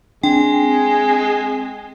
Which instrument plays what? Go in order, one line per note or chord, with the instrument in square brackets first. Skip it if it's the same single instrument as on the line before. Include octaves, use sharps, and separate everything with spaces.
[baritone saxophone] G#3 [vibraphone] C4 [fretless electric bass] D4 [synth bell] G5